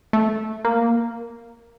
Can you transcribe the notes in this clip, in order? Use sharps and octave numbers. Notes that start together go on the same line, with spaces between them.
A3
A#3